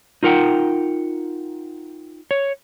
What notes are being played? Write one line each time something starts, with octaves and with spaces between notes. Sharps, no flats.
D#4 F4 A#4 F#5 G5
C#5